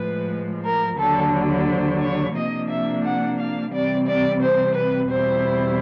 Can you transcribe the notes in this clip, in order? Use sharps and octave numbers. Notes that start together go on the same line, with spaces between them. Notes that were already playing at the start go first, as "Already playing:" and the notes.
Already playing: A2 F3 G#3 B4
A#4
D#2 D3 F#3 A4
C5
C#5
C3 F3 A#3 D4 D#5
E5
F#5
F5
C3 E3 G3 C4 D5
D5
C5
B4
E2 B2 G3 C4 E4 C5